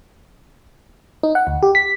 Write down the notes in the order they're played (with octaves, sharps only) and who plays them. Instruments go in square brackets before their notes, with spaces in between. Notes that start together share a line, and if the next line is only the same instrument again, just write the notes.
[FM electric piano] D#4
F#5
D2
G4
B6